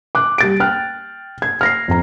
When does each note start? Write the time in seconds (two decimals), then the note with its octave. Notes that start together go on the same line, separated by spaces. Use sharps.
0.15 D6 F#6
0.38 G3 A6 D7
0.60 G5 F6 F#6
1.42 G#6
1.61 F6 A#6 C7
1.88 F2 A#5